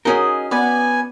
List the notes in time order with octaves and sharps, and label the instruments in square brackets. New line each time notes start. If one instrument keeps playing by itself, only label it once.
[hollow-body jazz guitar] C#4 F#4 A#4 [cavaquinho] D#4 G#4
[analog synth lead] B3 [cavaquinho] D5 [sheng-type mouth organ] G#5